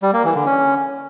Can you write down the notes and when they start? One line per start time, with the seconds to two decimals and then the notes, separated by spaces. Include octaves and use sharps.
0.03 G3
0.13 A#3
0.24 E3
0.35 D3
0.46 C#4